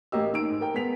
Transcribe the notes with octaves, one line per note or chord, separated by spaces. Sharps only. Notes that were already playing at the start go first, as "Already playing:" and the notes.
A1 A#3 G4 D#5 E6
D#3 E6 D7
G#2
A#4 G5
G#3 B3 B6 F7